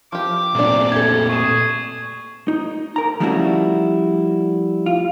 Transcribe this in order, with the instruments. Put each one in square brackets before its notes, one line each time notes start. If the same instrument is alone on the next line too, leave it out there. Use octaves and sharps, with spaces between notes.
[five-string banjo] F3 G4 [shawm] D6
[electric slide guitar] A#2 A3 C4 [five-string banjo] F#3 D4
[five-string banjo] G4 A4 [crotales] G#6
[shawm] G#4 [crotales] C#6 E7
[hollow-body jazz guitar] D#4
A#4 A#5
F3 G3 A3 C#4 E4 F#4
F4